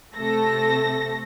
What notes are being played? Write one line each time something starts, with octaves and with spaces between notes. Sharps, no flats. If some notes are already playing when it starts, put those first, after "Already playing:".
C3 A3 A4 A#6